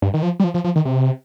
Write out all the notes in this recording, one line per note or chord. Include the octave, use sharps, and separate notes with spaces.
G2
D#3
F3
G3
F3
F3
F3
D#3
C3